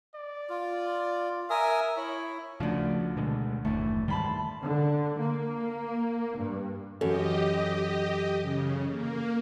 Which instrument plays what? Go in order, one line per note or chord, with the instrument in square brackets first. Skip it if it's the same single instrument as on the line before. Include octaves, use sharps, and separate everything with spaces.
[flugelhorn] D5
[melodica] F4
[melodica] A#4 G#5 D#6 [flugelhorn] E5
[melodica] E4 [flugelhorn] C#5
[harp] D2 D4 [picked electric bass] C#3 F3
[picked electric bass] B2 D3 G#3
[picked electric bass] F#1 D#2 A2 [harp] E3 A3
[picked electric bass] G#2 D#3 G3 [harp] A5 B5 C6
[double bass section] D3
A#3
G2
[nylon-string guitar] F#2 [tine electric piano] E3 A4 [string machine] G4 D#5
[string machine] C#3
A#3